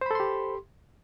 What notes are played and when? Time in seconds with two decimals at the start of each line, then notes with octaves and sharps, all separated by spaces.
0.01 C5
0.06 B5
0.11 A4
0.15 C6
0.20 G4